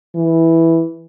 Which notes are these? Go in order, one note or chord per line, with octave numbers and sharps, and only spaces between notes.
E3